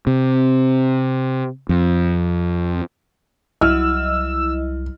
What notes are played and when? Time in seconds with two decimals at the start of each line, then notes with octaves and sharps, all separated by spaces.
0.07 C3
1.69 F2
3.61 C2 F#3 E4 D#5 E6 F6